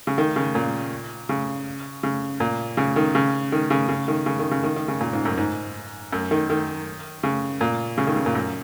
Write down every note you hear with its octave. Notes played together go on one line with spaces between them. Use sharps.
C#3
D#3
C#3
A#2
C#3
C#3
A#2
C#3
D#3
C#3
D#3
C#3
C#3
D#3
C#3
D#3
C#3
D#3
D#3
C#3
A#2
G#2
F#2
G#2
F#2
D#3
D#3
C#3
A#2
C#3
D#3
C#3
A#2
F#2